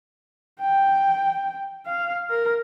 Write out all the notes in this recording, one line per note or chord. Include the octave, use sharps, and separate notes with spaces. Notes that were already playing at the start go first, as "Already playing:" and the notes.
G5
F5
A#4